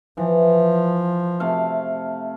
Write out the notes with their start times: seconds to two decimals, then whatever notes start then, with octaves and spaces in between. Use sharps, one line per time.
0.17 E3 F3
1.40 C3 A3 F5